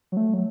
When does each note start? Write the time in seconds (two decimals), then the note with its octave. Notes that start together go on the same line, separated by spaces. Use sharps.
0.12 F#3
0.17 A3
0.34 F#3